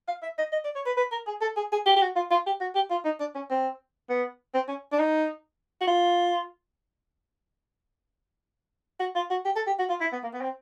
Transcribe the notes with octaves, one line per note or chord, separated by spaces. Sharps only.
F5
E5
D#5
D#5
D5
C#5
B4
B4
A#4
G#4
A4
G#4
G#4
G4
G4
F#4
F4
F4
G4
F#4
G4
F4
D#4
D4
C#4
C4
B3
C4
C#4
D4
D#4
F#4
F4
F#4
F4
F#4
G4
A4
G4
F#4
F4
E4
B3
A#3
B3
C4